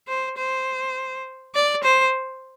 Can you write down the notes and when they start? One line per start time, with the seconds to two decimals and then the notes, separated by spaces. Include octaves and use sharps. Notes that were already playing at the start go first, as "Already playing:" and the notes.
0.08 C5
0.38 C5
1.55 D5
1.83 C5